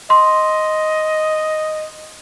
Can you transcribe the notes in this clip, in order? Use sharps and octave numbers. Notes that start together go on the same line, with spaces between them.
D#5 C6